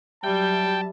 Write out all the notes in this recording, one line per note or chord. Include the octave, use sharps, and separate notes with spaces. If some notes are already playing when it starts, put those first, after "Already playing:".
F#3 G3 E5 G5 A5